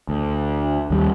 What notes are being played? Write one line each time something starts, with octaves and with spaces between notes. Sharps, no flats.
D2
D#2 G3